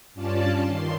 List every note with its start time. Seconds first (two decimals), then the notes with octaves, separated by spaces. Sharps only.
0.14 G2 C#4 F4 D5 A5
0.64 D#3 C6